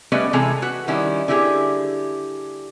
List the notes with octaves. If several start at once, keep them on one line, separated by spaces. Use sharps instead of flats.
G3 A3 B3 C#4 B4 D#5
C3 E3 G#3 G#4 A4 A#5
F#4 B4
D#3 G3 C#4 E4
D3 E4 G4 G#4